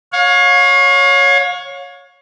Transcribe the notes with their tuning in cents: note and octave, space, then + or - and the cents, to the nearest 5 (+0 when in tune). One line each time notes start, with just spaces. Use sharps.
C#5 +0 F5 +35